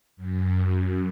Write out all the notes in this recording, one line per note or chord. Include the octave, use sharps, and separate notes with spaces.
F#2